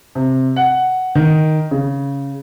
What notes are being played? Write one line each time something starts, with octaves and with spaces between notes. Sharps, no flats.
C3
F#5
D#3
C#3